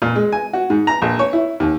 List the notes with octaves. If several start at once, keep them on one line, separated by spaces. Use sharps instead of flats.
A#2
G#3
G#5
F#4
G#2
A#5
A#1
C#5
E4
D#2